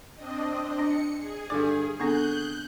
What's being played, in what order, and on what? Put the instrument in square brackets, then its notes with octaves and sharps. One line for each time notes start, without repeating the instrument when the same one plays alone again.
[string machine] C4 D4 D#5
[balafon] D4 [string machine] C#7
[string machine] G#4
[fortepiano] G2 D3 D6 [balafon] D5
[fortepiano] D3 G#4 C#6 [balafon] B3 C4 D4 [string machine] F#6 G6